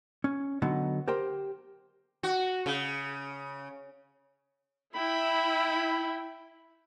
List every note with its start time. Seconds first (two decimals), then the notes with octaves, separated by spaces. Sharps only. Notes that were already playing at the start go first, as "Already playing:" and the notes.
0.24 C#4
0.62 D3 F#3 B3 D#4
1.08 G4 A#4 C5 G5
2.23 F#4
2.66 C#3
4.95 E4 G5 B5